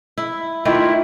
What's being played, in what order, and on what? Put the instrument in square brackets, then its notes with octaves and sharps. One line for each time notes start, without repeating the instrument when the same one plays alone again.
[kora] E4
[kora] D#3 A3 D5 [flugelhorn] E4 [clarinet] F4